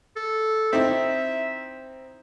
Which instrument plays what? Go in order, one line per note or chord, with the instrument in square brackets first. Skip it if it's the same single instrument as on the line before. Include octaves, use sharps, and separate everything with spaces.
[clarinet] A4
[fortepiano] C4 D#4 E4 [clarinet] E5